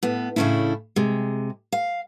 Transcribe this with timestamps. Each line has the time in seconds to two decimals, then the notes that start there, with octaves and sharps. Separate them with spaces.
0.03 A2 B3
0.36 A2 C#3 A3 C#4 D4 E4
0.96 C3 G#3
1.72 F5